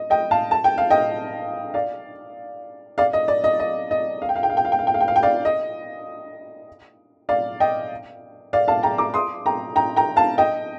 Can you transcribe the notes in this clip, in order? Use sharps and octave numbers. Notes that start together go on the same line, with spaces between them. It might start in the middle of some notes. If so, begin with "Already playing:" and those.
Already playing: D#5
D#5 G5
F5 A5
A5
G5
F5
D#5 G5
D5 F5
D5 F5
D#5
D5
D#5
D#5
D#5
F5
G5
F5
G5
F5
G5
F5
G5
F5
G5
F5
G5
F5
G5
D5 F5
D#5
D5 F5
D#5 G5
D5 F5
F5 A5
G5 A#5
A#5 D6
C6 D#6
G5 A#5
G5 A#5
G5 A#5
F5 A5
D#5 G5